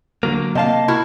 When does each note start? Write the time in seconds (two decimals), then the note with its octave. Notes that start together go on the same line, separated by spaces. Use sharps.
0.23 D3 F#3 A#3
0.55 C3 A#3 D#5 F5 A5
0.88 E4 F#4 A#4